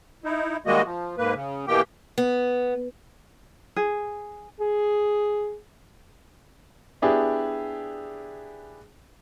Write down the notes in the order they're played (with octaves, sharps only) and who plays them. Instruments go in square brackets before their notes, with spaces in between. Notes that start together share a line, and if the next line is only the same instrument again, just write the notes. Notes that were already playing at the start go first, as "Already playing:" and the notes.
[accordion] D#4 E4
D#3 G3 G#3 A#3 F#4 D#5
F3
G#2 A#3 B4
C#3
B2 E3 A#3 G4 G5
[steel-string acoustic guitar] B3
[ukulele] G#4
[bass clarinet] G#4
[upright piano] B3 D4 E4 G4 G#4